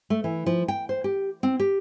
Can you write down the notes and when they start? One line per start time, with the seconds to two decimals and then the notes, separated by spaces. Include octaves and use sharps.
0.10 A3
0.24 E3
0.46 F3
0.68 G5
0.89 C5
1.04 G4
1.43 C4
1.60 G4